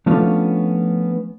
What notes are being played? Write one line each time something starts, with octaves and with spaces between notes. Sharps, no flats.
F3 A3 B3 C#4 D4 F4